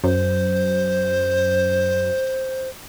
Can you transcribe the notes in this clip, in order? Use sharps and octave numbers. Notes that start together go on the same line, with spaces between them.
F#2 C5